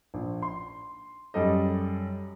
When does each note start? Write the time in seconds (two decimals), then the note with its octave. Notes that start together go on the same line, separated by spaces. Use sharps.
0.14 A#1
0.42 C6
1.34 F#2 G3 A4 D#5